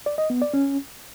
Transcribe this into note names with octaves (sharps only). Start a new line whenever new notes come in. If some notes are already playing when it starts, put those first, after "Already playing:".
D5
D#5
B3
D5
C#4